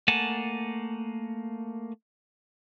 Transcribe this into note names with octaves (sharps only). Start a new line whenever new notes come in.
A3 A#3 F#5 G#5 A5